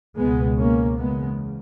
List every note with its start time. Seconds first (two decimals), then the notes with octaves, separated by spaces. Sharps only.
0.19 C#2 B2 G#3 B3
0.59 A#3 C#4
0.98 E2 C#3 G#3 B3